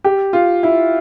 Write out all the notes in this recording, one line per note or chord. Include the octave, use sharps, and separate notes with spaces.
G4
F4
E4